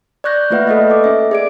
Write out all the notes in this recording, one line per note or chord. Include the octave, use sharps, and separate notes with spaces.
D5 C#6 F#6 G6 A#6
A3 A#3 F4 B4 E5 F#5
A4 B4 D#5
A4 D6
C#4 E5
G#4 D5 D7